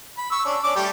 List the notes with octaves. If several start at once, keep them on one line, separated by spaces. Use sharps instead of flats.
B5
C#6 E6
C#4 D4
C#4 D4 D6
G3 A3 G4